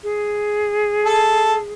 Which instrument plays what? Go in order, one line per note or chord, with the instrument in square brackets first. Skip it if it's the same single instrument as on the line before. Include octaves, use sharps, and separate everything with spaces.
[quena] G#4
[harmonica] A4